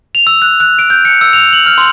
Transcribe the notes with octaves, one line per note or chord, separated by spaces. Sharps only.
F7
E6
F#6
F#6
D7
G6
C#7
E6
F7
F#7
F6
C6